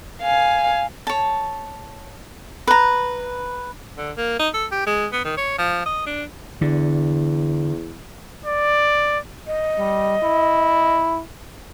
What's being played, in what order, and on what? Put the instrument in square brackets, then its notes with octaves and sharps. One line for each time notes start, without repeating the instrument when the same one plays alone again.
[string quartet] F5 G#5
[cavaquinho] C#5 A5
B4 A#5
[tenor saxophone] D3
A#3
D#4
A4
G4
G#3
B3
D#3
C#5
F3
D#5
D4
[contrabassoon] E2 [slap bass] D3
[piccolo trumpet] D5
[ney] D#5
[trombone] G3
E4